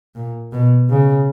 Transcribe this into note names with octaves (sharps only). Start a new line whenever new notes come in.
A#2
B2
C#3